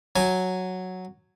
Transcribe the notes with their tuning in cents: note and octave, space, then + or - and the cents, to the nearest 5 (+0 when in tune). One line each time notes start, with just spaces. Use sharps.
F#3 +0 G#5 +0